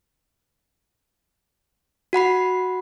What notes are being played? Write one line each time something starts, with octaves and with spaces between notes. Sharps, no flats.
F#4 F#5 B5 C7